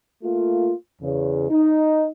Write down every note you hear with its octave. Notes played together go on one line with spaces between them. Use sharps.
A3 A#3 F4
E2 C#3
D#4